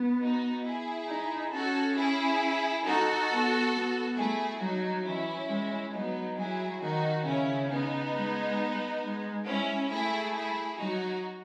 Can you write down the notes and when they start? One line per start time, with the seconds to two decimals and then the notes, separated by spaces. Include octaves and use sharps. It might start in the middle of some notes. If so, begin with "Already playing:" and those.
Already playing: B3
0.19 D#4 F#4
0.63 E4 G#4
1.08 D#4
1.52 C#4 F#4 A4
1.96 E4 G#4
2.84 D#4 F#4 A4
3.29 B3
3.73 B3
4.16 A3 E4 G#4
4.61 F#3 D#4 F#4
5.05 E3 C#4 E4
5.49 G#3
5.93 F#3 B3 D#4
6.37 F#3 E4 G#4
6.81 D#3 D#4 F#4
7.26 C#3 C#4 E4
7.70 B3 D#4
8.14 G#3
9.03 G#3
9.46 C#4 E4
9.90 A3 E4 G#4
10.34 E4 G#4
10.79 F#3 D#4 F#4